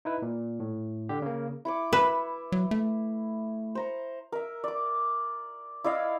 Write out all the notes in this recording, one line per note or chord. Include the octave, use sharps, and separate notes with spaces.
D#4 E4 B4
A#2
A2
D3 G4
C#3 A#3
E4 C#6 D6
B4 E5
F#3
A3
C5 A#5 C#6
A#4 E5
D5 D6
E4 D5 D#5 F5